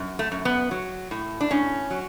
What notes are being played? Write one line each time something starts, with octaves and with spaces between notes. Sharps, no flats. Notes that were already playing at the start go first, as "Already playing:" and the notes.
Already playing: F#2
A3
F#2
B3
F#3
A2
D4
A2 C#4
F#3